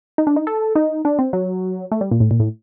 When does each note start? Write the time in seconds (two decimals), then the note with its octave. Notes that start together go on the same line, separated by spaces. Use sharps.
0.18 D#4
0.27 D4
0.36 D#4
0.47 A4
0.75 D#4
1.05 D4
1.19 C4
1.33 F#3
1.92 A3
2.01 G3
2.11 A#2
2.20 A2
2.31 A#2
2.40 A2